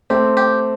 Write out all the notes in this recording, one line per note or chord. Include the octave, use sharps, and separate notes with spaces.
A3 C4 G4
G4